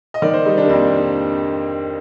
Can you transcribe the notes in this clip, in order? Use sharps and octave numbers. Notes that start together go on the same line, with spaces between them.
D#5
D#3 D5
C5
G3 D#4
D4
A#3
F2 C4